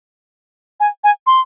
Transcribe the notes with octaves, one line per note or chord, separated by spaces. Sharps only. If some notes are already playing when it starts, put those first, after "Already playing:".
G#5
G#5
C6